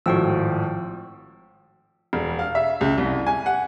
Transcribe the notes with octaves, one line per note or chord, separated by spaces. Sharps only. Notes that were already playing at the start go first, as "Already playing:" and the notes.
G#1 A2 F3 F#4 G5 E6
E1
F5
E5
C#2
C2
G#5
F#5